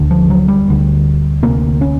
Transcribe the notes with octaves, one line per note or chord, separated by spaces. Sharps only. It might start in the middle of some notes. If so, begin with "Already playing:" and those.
Already playing: D2 D3
F3
F#3
G3
D2 D3
D2 C3 A#3
C#4